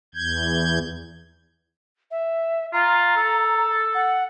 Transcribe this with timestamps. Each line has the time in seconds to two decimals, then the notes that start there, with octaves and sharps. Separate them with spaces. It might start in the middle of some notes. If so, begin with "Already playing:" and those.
0.15 E2 G6 G#6
2.11 E5
2.73 F4 A#5
3.16 A4
3.95 F#5